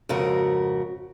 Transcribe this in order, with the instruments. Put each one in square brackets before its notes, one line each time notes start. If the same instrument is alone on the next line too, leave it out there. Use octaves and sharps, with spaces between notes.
[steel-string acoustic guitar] F2 G#2 C#3 F#4 A#4